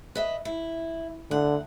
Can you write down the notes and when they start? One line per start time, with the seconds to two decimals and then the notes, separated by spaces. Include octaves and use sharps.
0.15 B4 D#5 E5
0.45 E4
1.31 D2 D3 F#5